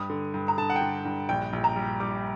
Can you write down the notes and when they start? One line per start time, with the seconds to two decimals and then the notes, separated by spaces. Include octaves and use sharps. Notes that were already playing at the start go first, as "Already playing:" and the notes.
Already playing: G2 D#6
0.10 D3
0.34 G2
0.48 A#5
0.58 D3 A5
0.70 F#5
0.76 G5
0.81 D3
1.05 G2
1.29 A#1 G5
1.53 A#1
1.64 A#5
1.76 G3
2.00 G3 D6